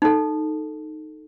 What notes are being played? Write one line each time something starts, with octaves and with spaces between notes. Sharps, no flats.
D#4 A4